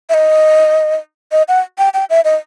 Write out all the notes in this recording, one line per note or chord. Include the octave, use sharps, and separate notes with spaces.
E5
D#5
D#5
F#5
G5
G5
E5
D#5